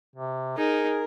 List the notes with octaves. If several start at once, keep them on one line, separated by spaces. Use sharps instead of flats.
C3
D#4 G#4 A#4